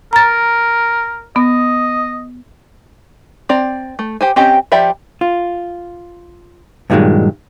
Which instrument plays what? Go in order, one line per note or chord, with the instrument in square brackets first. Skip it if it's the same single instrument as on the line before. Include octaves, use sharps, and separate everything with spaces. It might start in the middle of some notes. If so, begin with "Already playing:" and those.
[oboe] A#4 [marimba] A#5 A6
[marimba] B3 [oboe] D#5
[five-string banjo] C4 D5 A#5
A3
G4 C5 G#5
C4 C#4 G4 C5 D#5
F3 G4 D5 E5 B5
[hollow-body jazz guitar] F4
G2 A#2 D#3 E3 F#3 G#3